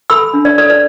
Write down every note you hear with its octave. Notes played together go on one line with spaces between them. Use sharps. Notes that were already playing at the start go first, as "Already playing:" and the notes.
A4 B5 E6
D4
D5
A4 D5
D5